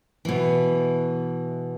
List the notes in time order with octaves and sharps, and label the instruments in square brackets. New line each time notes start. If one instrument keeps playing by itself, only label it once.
[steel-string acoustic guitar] B2 E3